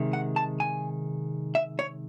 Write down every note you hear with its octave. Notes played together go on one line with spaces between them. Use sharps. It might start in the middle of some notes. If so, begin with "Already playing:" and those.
Already playing: C3 D#3 G#3
F#5
A5
G#5
E5
C#5